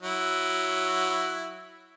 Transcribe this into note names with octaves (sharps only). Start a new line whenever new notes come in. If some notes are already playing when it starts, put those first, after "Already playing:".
F#3 E4